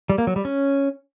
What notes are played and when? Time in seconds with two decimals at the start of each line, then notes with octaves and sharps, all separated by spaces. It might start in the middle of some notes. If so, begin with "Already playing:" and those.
0.09 G3
0.18 A#3
0.27 F#3
0.36 G3
0.45 C#4